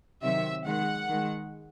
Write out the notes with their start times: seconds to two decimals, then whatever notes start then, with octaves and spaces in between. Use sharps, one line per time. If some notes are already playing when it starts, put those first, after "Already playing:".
0.23 C3 D#3 F#3 E5
0.66 D#3 G#3 F#5
1.09 D#3 G#3